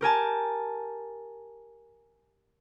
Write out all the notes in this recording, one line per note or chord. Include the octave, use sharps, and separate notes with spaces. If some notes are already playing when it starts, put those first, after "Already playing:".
G4 A#4 G#5 A5